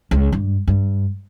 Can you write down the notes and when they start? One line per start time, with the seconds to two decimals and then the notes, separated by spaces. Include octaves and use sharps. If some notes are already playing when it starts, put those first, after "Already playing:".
0.11 C#2
0.32 G2
0.67 G2